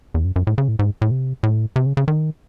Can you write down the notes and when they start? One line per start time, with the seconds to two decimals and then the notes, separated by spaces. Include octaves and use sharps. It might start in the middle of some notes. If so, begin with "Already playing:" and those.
0.14 E2
0.25 F#2
0.36 F#2
0.47 A2
0.58 C#3
0.68 A2
0.79 G#2
1.02 A2
1.11 C3
1.43 A2
1.76 C3
1.86 C#3
1.97 C#3
2.08 D#3